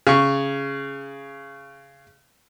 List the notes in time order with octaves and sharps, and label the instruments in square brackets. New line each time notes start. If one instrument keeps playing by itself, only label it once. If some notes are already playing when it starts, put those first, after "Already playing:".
[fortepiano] C#3 C#6